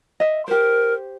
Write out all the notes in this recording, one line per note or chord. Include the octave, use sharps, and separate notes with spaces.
D#5 E5
G4 A#4 C5